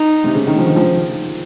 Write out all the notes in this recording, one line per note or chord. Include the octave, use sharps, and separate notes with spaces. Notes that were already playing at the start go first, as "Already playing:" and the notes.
Already playing: D#4
C3
C#3
D#3
F3
D#3
F3